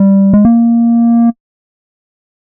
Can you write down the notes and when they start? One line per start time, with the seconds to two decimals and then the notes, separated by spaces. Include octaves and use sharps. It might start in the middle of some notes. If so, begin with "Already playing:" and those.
Already playing: G3
0.33 G#3
0.45 A#3